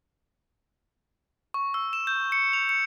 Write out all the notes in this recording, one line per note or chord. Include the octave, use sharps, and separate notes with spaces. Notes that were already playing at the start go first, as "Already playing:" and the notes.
C#6
E6
E7
G6
C#7
F7
C#7